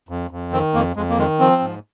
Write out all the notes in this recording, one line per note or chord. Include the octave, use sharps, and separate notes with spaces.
F2
F2
D#3 C4
F2 A#3
F2 G#3
A#3
D#3 G#3
F3 C4
G#2